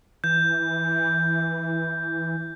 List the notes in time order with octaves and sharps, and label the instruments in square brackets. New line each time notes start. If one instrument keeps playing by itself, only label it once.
[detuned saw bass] E3 [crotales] G6